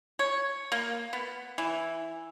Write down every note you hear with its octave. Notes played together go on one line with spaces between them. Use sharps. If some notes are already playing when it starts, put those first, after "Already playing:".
C#5
A#3
B3
E3